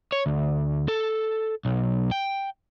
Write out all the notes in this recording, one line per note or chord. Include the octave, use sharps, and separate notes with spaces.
C#5
D2
A4
B1
G5